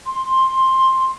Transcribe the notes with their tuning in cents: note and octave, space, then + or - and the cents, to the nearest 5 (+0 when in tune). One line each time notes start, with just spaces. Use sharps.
C6 +10